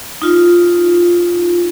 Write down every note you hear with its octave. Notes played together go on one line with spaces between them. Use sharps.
D#4 F4